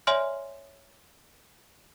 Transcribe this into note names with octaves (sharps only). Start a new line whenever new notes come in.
C#5 D5 E5 G#5 C6 F6